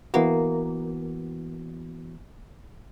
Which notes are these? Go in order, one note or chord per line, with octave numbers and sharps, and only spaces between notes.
E3 A#3 B3 F#4